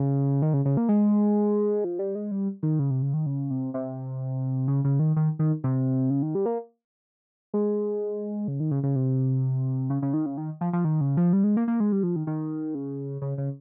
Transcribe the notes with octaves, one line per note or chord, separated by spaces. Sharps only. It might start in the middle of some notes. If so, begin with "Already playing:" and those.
Already playing: C#3
D#3
C#3
C#3
A#3
G#3
F3
G3
G#3
G3
D#3
C#3
C3
C#3
D#3
C#3
C3
C3
C#3
C#3
D#3
D#3
D#3
C3
C#3
D#3
G3
A#3
G#3
C#3
D#3
C#3
C#3
C3
C#3
C#3
D#3
C#3
D#3
F3
F3
D#3
C#3
F3
G3
G#3
A#3
A#3
G#3
G3
F3
D#3
D#3
C#3
C#3
C#3